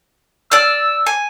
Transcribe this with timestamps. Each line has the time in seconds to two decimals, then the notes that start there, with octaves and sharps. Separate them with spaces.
0.52 D5 E6 F6
1.07 G#5